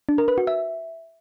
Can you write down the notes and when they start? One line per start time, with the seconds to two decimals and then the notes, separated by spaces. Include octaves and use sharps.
0.09 D4
0.18 A#4
0.28 B4
0.38 F#4
0.47 E5